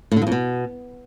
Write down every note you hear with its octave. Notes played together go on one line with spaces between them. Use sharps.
A2
D3
G2
F2
B2